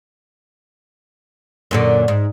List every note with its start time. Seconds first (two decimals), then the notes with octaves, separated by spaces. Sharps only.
1.71 F#2 A#2 D3
2.08 G#2